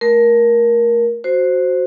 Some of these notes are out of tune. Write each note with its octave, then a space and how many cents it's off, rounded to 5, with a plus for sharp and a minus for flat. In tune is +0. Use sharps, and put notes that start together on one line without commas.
A3 +0 A#4 +15
F#4 +0 C5 +0